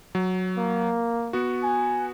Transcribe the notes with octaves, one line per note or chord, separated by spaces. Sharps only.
F#3
A#3
B3 F#4
G#5